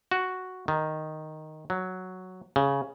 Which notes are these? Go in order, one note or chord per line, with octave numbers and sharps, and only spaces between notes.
F#4
D#3
F#3
C#3